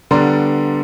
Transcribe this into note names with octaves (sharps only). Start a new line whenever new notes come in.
D3 G3 B3 D5 A#5 C6